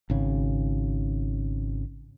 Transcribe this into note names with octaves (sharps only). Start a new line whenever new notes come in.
G#1 C#3